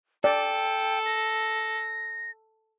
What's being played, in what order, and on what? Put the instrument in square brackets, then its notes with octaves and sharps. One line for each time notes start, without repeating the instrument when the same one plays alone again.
[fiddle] A4 [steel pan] D5 [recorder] G5
[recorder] A#6